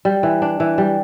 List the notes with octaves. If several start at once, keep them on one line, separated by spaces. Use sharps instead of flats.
G3
E3
D4
E3
G3